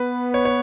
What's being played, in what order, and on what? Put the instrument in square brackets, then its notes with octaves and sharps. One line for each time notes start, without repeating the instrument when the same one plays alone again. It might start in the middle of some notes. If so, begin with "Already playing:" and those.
Already playing: [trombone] B3 [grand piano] B4
[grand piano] C#5
C#5